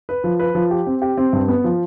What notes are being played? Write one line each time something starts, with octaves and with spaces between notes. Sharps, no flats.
B4
F3
B4
F3
G4
C4
G4
C4
G2
B3
F3